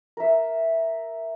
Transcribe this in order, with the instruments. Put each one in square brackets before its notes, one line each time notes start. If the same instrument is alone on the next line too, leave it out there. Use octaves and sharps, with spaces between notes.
[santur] A#4 E5